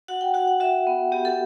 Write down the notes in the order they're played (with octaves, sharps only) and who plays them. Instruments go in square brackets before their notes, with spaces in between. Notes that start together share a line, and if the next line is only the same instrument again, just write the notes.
[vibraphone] F#4 F#5
G5
F#4 F#5
F#5
F#4 E5
B3
B3 G4
A4